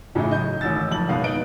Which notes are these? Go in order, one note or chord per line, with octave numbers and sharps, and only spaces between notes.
A2 C#3 E3 D#4 E4
F#3 F#4 D#5 G6
A1 D#3 E6 A6
F#1 F2 F#7
F#1 G#2 B2 B3 F5
D#4 B4 D7